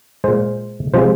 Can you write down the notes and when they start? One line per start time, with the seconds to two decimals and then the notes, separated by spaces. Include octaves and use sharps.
0.24 A#2 G#3 C5
0.94 C3 F3 G#3 C5